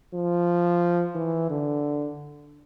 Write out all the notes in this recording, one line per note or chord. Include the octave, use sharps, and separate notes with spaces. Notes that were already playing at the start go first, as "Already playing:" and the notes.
F3
E3
D3